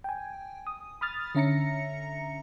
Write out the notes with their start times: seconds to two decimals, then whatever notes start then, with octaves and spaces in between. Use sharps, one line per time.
0.04 G5 G#5
0.67 D#6
1.01 B5 D#6 F6 A6
1.35 D3 C#4 E5 A#5 A#6 C#7